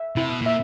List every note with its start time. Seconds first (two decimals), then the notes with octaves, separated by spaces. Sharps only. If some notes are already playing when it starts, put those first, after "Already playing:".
Already playing: E5
0.16 C3 E4
0.29 B2
0.41 A#2 E5